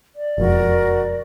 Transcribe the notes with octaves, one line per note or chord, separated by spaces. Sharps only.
D5
E1 F2 F#4 A#4